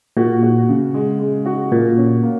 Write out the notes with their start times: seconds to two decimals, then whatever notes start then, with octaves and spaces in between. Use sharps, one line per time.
0.17 A#2 F#4
0.43 F#4
0.69 C#3
0.94 G#3
1.19 G#3
1.46 F#4
1.72 A#2 A#3
1.97 C#4
2.23 A#3